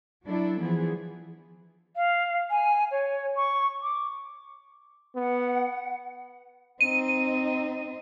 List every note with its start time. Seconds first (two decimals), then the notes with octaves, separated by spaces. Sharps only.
0.24 F#3 D4 E4 A4
0.60 E3 F3 B3 G#4
1.96 F5
2.51 G#5
2.91 C#5
3.36 C#6
3.82 D6
5.16 B3 F#5
6.81 C4 D#4 D#7